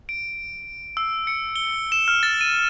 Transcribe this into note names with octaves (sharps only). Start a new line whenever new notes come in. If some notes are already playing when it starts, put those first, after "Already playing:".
D7
E6
C#7
G7
E7
F6
A6
D#7